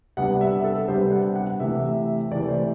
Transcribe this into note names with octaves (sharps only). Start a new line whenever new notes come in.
C3 G3 B3 D4 F#5
E5
A4
C3 G3 B3 D4 C5
F#5
F#5
C3 E3 A3 E5
C3 E3 A3 D5
C5